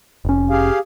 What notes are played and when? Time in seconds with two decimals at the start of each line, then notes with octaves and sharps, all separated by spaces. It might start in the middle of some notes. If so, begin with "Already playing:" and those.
0.25 F1 C#4
0.50 G4 G#4 F5